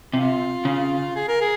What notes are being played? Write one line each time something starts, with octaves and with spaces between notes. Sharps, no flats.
C3 F4
C#3
G#4
A#4
G#4